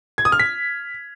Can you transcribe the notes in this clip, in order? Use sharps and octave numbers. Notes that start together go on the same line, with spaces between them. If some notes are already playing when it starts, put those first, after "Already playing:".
G#6
D#6
F6
B6